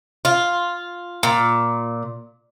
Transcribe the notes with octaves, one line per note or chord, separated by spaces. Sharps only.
F4
A#2